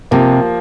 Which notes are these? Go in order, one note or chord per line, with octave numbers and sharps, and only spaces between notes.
C3 F3 A#3